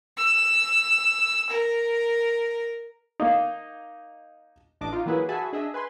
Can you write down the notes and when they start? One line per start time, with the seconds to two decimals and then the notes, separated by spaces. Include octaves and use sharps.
0.18 E6
1.49 A#4
3.20 A#3 D#4
4.81 A1 D4 D#5 D6
4.93 D#4 F4
5.06 E3 F#3 A#3 E4 G#4 B4
5.29 F#4 G#4 E5 G#5 A5 B5
5.53 D4 G#4 D#5 E5
5.74 B4 G#5 C6